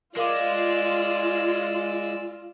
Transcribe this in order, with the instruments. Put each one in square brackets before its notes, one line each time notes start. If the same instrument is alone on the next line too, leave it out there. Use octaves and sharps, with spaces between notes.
[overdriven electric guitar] G#3 [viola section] F4 [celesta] A#4 F5 D6 [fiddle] D5 E6